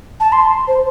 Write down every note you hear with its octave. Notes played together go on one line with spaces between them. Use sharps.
A5
C6
C5